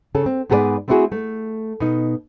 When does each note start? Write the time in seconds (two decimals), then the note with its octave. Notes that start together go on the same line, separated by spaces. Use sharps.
0.15 C#3 C#4 A4
0.26 C4
0.50 G#2 B3 G#4 A4 B4 D5
0.88 A3 C4 D4 E4 F#4 G#4
1.12 A3
1.80 B2 D#4